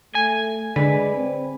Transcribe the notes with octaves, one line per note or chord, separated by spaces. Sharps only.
A3 G#5
D3 G#3 B4 D5 G#5 B5
C4